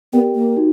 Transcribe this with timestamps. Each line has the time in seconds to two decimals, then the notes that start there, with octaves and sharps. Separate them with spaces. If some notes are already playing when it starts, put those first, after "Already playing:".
0.13 B3 G4 A#4 D5 G5
0.35 A#3
0.57 D#4 F#4